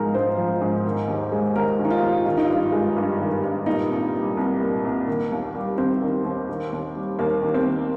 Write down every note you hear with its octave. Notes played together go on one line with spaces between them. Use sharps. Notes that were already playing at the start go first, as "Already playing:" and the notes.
Already playing: G#2 F3 G#3 D#4 A#4
G#2 C5
F3
G#2
D#3
D#2
G#3
D#2 A#4
D#3
D#4
F4
D#2
D#3 F4
D#4
G2 F4
G#3
G2
D#3
G2
A#2 D#4
C2
G3
C2
A#2
C2
D#3
D#2
G3
D#2 C4
D#3
D#2
D#3
D#2
G3
D#2 A#3
D#3
C4
D#2